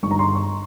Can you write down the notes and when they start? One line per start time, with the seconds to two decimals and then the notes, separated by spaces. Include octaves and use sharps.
0.03 G1 G2 D#3 C#6
0.11 A#5
0.19 C6
0.35 C#6